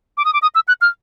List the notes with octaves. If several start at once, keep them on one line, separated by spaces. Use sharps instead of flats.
D6
D#6
D6
D#6
E6
F#6
F6